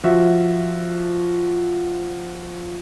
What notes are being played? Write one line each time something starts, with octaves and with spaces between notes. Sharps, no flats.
F3 F#4 E5